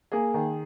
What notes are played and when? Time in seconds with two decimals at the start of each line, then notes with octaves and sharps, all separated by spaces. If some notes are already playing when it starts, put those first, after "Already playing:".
0.12 A#3 G#4
0.34 D#3